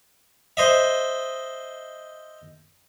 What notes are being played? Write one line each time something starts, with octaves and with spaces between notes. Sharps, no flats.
C5 D#5 E5